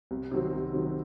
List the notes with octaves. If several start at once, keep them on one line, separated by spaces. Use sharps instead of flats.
C2
C3 D#3 F#3 C4
C2
C3 D#3 F#3 C4